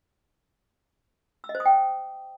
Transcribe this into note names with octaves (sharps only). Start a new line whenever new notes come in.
E6
D#5
C5
D#6
G5